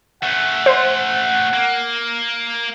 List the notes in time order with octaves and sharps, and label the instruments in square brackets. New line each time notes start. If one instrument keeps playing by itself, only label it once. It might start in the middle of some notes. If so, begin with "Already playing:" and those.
[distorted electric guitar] A3 C#4 [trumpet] F#5
[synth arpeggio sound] C5
[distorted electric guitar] A#3